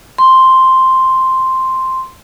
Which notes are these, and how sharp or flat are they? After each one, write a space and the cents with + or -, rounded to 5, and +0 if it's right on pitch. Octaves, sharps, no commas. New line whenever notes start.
C6 +0